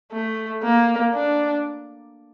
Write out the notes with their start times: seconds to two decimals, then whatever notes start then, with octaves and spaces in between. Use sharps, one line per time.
0.12 A3
0.63 A#3
1.14 D4